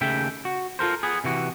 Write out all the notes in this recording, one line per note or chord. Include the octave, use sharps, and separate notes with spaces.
D#2 C#3 A3 E5 G5
F#4
F4 A4 A#4 C5
B3 G#4
C3 E3 F#4